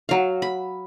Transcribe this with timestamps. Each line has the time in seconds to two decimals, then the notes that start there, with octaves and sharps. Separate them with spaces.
0.09 F#3 F5
0.42 B5